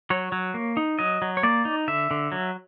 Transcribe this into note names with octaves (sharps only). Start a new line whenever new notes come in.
F#3 C#5
F#3
A#3
D#4
F#3 D#5
F#3
C#5
A#3 D5
D#4
D3 E5
D3
F#3